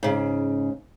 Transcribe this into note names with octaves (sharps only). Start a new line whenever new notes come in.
G#2 C#3